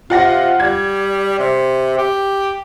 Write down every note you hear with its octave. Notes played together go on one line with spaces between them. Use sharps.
C3 F4 F#5 A#6
G3 G#6
C3
G4